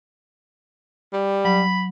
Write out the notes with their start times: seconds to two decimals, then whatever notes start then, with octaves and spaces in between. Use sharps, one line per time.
1.13 G3
1.45 F#3 B5